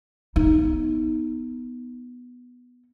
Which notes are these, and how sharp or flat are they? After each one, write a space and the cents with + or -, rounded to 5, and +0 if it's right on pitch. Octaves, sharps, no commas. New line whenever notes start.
B3 +0 D#4 +10